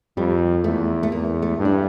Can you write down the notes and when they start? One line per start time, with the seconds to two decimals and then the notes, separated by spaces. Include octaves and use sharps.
0.17 F2 G3
0.64 E2 A3
1.03 A3
1.11 E2 A#3
1.42 A3
1.58 G2
1.65 D4